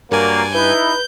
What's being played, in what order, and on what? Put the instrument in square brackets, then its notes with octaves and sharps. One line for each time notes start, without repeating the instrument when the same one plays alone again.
[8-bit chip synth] G2 G#5 [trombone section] F#3 A#3 [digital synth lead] A#4 [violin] D5
[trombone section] D#4 E4 [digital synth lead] B4 [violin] G6